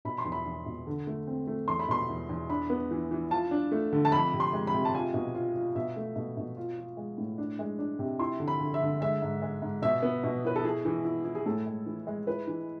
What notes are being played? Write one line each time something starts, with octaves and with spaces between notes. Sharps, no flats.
B2 B5
C6
E2
B5
E2
B2
D3
A3
C4
A3
E2 C6
B5
B2 C6
E2
E2
D4 B5
B3
E3
E3
F4 A5
D4
A3
D3
A5
F2 B5
C3
C6
G#3
B5
C3
A5
F4 G#5
B2
F4
F4
B2 E5
A3
B2
B2
F4
F4
G#3
A2
D4
G#3
D4
C3
E4 C6
D3
B5
D3
E5
D3
G#3 E5
G#2
G#3
G#2
B2 E5
B3
B2
E4 B4
A4
E4 G#4
E3
E4
E4
G#4
A2 A4
G#3
E3
G#3
E4 B4
E3